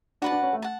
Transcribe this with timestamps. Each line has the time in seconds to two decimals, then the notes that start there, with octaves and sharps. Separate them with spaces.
0.22 D4 F#4 B4 F#5 A5
0.32 D4
0.43 C#4
0.53 A3
0.62 F#5 A5